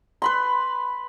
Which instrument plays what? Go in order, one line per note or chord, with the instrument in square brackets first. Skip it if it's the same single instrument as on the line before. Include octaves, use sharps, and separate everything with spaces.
[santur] B4 B5 C6